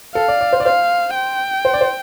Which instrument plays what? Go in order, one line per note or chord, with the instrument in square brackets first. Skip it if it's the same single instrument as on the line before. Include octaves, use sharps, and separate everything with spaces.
[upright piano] A4 [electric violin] F5
[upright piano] D5
D5
C5
D5
[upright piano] C5 [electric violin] F5
[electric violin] G5
[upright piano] C5
D5
C5